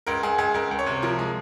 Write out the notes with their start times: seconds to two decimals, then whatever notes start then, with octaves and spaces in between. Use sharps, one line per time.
0.07 C#2 A#4
0.23 C#2 G#4
0.38 C#2 G#4
0.54 C#2 A#4
0.71 C#2
0.79 C#5
0.86 C3
1.02 F3 A#4
1.19 G#3